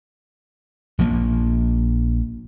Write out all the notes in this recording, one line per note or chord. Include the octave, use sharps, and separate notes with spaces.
A#1 F3 A#3